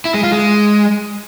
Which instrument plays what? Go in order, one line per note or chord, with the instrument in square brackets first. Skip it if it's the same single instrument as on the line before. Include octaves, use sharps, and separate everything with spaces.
[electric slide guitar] E4
G#3
F4
G#3